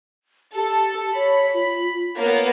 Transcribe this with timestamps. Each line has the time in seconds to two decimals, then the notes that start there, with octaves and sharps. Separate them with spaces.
0.55 G4 A4
1.14 C#5 B5
1.54 F4
2.17 A#3 B3 C#5